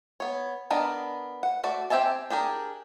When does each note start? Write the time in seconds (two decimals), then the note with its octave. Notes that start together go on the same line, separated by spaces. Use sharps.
0.20 B3 C#5
0.70 B3 D4 A#4 B4 D#5
1.43 F#5
1.64 A3 F#4 D5
1.90 C4 G4 E5 G#5 A5
2.30 D4 G4 G#4 A#4